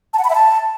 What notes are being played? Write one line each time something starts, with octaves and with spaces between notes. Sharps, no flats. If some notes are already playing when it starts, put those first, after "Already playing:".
A5
F#5
B5
E5
A5